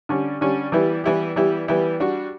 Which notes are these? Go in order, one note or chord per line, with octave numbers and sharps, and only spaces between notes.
D3 G3 C#4
D3 G3 C#4
E3 G3 B3 E4 G4
E3 G3 B3 E4 G4
E3 G3 B3 E4 G4
E3 G3 B3 E4 G4
G3 D4 F#4